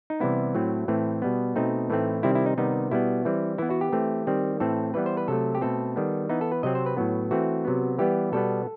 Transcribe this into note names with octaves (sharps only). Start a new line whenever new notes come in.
D#4
C3 E3 G3 B3 E4
A2 F#3 A3 C4
A2 E3 A3 C4
B2 G3 B3
B2 A3 C4 D#4
A2 E3 A3 C4
C3 D#3 G3 C4 E4
E4
D#4
C3 D#3 G3 B3 D#4
B2 G3 B3 E4
E3 G3 C4
E3 B3 E4
F#4
G4
E3 A3 C4
D#3 G3 C4
A2 E3 A3 C4 A4
E3 G3 B3 B4
C5
B4
C3 F#3 A3 A4
G4
B2 A3 C4 A4
D#3 G3 B3
E3 B3 D#4
A4
B4
C3 F#3 C4 D#5
C5
B4
A2 F#3 B3
E3 A3 C4 F#4
C3 F#3 B3
E3 G3 B3 G4
B2 G3 B3 A4